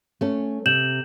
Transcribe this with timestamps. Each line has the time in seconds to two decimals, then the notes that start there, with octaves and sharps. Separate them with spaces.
0.21 A3 C#4
0.66 C3 G6 E7 F#7